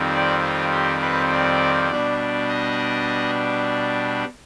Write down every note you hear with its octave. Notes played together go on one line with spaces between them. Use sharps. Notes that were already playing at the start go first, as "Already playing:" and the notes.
Already playing: F2 D#3 G3 C4
D5
F4
G4
B4
D5
B2 G3 D4
D#5